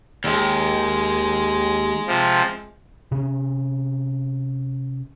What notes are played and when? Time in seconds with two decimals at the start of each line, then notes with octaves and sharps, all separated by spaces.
0.24 D#2 G#3
2.07 C3 F3
3.11 C3 C#4